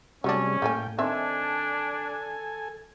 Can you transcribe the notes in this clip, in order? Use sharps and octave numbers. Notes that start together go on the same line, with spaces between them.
C3 F#3 G3 A3 C#4 D4 G#4
A2 A#3 A4 G5 G#5
D#3 C4 D4 A4 E5 G#5